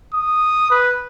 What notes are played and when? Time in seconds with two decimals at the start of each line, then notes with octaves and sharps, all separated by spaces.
0.13 D#6
0.70 B4